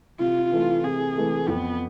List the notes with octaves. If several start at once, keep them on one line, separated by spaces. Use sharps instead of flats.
C3 F4
E3 A3
C3 G#4
E3 A3
F2 B3